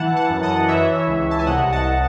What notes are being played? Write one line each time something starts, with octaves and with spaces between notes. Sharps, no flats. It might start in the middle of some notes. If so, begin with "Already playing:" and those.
Already playing: E3 F#5 A5
F#5 A5
F#2
D#5 F#5
E3 C#5 E5
C#2
A5
G#5
C2 D#5 F#5
F#5 A5